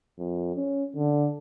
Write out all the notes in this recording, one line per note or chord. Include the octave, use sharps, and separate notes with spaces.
F2
C#4
D3